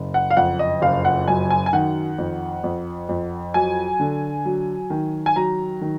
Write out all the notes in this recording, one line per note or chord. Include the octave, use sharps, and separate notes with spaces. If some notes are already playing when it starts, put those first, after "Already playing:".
Already playing: F#1
F#5
F5
F2 F#5
D#5
F#1 F5
F#5
F#2 G#5
G#5
G#5
D#3 F#5
F2
F2
F2
F#3 G#5
D3
F#3
D#3
G#5
F#3 A#5
D#3